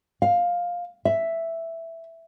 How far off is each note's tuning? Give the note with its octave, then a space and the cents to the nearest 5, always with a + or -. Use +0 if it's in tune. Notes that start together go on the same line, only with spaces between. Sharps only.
F5 +10
E5 +5